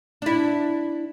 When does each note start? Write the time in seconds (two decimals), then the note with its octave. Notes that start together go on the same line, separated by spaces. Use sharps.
0.22 D4 E4